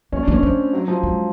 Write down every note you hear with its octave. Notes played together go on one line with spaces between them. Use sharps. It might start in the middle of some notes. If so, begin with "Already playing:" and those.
A#3 C#4
D4
A#3
C#4
A3 C4
F#3
F3
G#3